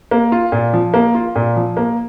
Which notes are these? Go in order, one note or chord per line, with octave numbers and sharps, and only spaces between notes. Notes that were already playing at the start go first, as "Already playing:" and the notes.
A#3
F4
A#2
F3
A#3
F4
A#2
F3
A#3